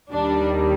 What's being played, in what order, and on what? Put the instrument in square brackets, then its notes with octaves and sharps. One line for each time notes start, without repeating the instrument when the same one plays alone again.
[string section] D#2 D#3 G3 D4